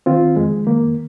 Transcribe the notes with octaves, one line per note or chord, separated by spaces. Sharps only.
D#3 C4 F4
F2 G#3
D#3 A#3